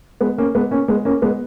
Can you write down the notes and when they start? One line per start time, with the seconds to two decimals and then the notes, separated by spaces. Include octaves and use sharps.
0.21 G#3 B3
0.38 A#3 C#4
0.55 G#3 B3
0.71 A#3 C#4
0.88 G#3 B3
1.05 A#3 C#4
1.22 G#3 B3